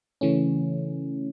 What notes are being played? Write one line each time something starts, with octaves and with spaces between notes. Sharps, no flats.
C#3 E3 A3 C#4